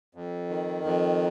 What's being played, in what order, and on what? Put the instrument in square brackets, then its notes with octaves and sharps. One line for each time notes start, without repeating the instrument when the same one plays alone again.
[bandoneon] F2
D#3
F2